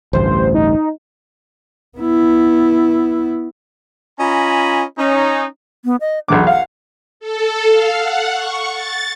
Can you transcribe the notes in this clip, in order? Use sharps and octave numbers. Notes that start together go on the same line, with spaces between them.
A1 D2 G2 C5
D#4
B3 E4
C#4 F4 D#5 G#5 A#5 B5
C#4 D#4
B3
D#5
B1 E2 D4 D6
F5 F#5
A4
F5
F#5
C#6
A6